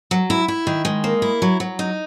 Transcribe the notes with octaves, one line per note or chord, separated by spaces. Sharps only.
F#3
E4
E4
D#3
G#3
A#3
E4
F#3
F#3
D#4